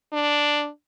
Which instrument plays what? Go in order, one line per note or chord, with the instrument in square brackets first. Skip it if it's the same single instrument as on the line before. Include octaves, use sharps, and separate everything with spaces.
[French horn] D4